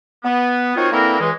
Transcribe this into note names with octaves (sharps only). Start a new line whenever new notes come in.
B3
C4 D#4 F4 F#4 A#4 C#5
D3 E3 A#3 C4 E4 A#4
C#2 E3 G#3